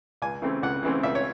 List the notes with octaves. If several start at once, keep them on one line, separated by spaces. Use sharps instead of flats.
C#2 G#5
C#3 E3 A3 C4
C#2 F#5
C#3 E3 A3 C4
C#2 E5
C#5